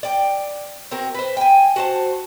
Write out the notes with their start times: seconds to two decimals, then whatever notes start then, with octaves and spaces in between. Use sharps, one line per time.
0.03 D5 G5
0.91 C4 F#4 A#4
1.15 B4 C5
1.37 G5 G#5
1.76 F#4 C5 A5